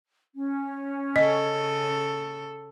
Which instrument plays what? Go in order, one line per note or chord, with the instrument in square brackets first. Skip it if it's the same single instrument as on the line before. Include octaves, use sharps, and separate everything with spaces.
[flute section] C#4
[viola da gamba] C#3 A4 [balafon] D#5